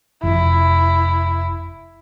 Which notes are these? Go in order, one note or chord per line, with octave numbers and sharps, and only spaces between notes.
F1 E4